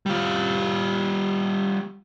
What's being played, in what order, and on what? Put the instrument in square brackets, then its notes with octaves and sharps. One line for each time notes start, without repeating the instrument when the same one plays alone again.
[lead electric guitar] G3 F4